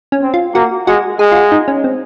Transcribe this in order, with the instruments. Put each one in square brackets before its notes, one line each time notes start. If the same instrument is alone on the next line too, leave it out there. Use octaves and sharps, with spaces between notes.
[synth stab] C#4
[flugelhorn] C4
[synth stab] F4
[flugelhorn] A#3 [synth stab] F#4
[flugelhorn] G#3 [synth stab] F#4
[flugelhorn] G#3 [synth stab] G#4
[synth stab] F4
F#4
D#4
C#4
C4